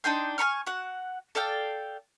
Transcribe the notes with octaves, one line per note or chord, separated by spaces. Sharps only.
D4 D#4 G5 C6
G#5 B5 C#6 F6
F#4 F#5
A4 D5 F5 G5